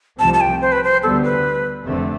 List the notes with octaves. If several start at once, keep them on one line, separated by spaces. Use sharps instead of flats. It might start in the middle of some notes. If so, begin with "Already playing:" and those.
C2 C3 F3 A3 C4 A5
A5
G5
C5
B4
C5
D2 D3 G3 B3 A4
B4
F1 F2 D3 A3 C4